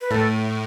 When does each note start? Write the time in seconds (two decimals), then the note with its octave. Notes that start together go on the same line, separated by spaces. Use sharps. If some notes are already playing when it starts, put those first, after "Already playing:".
0.01 B4
0.11 A2 A4